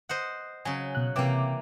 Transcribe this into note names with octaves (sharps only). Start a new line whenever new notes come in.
C5 D#5 F#5
C#3 F#3 G#5
B2 F#6
C3 E3 A#3 G5 D6